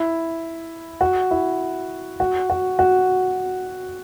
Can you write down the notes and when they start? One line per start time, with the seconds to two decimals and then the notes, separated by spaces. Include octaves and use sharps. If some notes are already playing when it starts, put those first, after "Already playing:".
Already playing: E4
1.01 F#4
1.31 E4
2.20 F#4
2.50 F#4
2.79 F#4